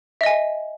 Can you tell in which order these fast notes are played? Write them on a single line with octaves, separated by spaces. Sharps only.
E5 D#5 G#5